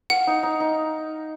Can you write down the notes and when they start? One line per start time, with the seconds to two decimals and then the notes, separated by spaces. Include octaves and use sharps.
0.10 F5 F#5
0.27 D#4
0.43 D#4
0.60 D#4